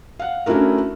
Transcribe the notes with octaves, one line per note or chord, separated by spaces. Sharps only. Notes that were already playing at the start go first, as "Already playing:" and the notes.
F5 F#5
A3 C#4 D4 E4 F#4 A#4